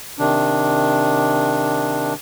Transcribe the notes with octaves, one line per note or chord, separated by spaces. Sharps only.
C3 D#3 D4